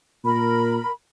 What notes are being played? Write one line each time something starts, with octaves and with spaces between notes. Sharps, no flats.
A#2 A#4 B5